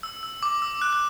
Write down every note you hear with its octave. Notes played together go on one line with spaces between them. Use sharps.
E6
E6
D6
E6
F#6
F#6